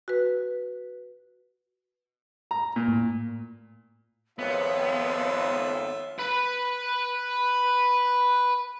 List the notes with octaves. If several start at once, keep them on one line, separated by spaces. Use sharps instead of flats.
F#4 B4
A#5
A#2
A2
G#1 F2 B3 F4 C#5 E5
B4 B5